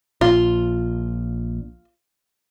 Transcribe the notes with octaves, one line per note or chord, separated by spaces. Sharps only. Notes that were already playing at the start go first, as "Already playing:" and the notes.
A#1 F4